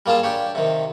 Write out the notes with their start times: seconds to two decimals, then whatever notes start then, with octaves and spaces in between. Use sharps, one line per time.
0.06 G3 A#3 F4 G#4 A5
0.23 D4 G4 C#5
0.55 C3 D#3